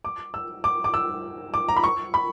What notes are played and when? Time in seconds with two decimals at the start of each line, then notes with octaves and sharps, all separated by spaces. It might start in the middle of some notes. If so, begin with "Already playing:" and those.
0.05 D6
0.34 E6
0.64 D6
0.84 D6
0.94 E6
1.54 D6
1.68 A#5
1.76 B5
1.84 C#6
2.14 B5